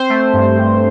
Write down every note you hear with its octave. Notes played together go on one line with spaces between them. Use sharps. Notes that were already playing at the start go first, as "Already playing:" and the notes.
Already playing: C4 C5
A3
G2
G2